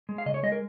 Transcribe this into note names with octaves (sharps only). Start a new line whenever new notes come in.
G#3
F5
C#3 D#5
C#5
G#3 D#5
A#4